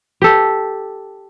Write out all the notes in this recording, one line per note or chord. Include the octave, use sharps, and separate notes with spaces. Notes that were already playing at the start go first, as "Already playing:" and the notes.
G4 A4